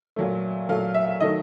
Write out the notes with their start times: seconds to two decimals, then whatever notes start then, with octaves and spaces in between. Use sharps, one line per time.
0.16 A#2 F#3 A3
0.69 A#2 F#3 A3 F5
0.94 E5
1.20 D#3 F#3 A3 D#5